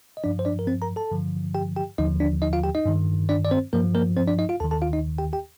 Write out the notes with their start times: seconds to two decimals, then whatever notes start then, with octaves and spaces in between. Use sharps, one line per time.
0.17 D#5
0.24 G2 F3 D4 D5
0.39 C5
0.45 D4 D5
0.59 A#4
0.67 C4 C5
0.82 A#4 A#5
0.96 A4 A5
1.11 G2 D3 F3
1.55 G4 G5
1.76 G4 G5
1.98 D#2 D3 F3 D#4 D#5
2.20 D4 D5
2.42 D#4 D#5
2.53 F4 F5
2.63 G4 G5
2.75 D#4 D#5
2.85 G2 D#3
3.29 D4 D5
3.45 D5
3.51 C4 C5
3.73 G2 F3 A#3 A#4
3.95 A#3 A#4
4.17 C4 C5
4.27 D4 D5
4.39 D#4 D#5
4.49 F4 F5
4.60 D#2 D#3 A4 A5
4.71 A4 A5
4.82 F4 F5
4.93 D#4 D#5
5.18 G4 G5
5.33 G4 G5